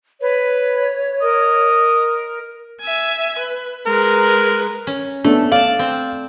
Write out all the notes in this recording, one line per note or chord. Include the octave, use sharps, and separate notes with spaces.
B4 C#5
A#4 D#5
E5 G#5
B4
G#3 A#4 B4
C#4
A3 B3 D4
D5 F5 A5
C4